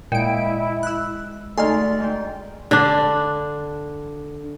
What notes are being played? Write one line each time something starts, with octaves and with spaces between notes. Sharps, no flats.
A#2 G#3 E4 G5 D7
E6 F#6
D2 D#4 G#4 A4 D5 C6 F6
G#2 G5
D3 D4